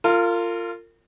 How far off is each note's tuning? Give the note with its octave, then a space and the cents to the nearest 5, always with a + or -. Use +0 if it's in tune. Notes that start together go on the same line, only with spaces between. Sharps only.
F4 -10 A#4 -40